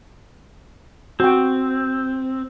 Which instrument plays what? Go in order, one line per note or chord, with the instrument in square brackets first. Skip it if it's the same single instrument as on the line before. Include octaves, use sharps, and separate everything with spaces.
[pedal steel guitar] C4 [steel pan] F#4 G5